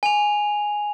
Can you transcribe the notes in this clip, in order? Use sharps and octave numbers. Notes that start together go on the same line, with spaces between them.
G#5 F7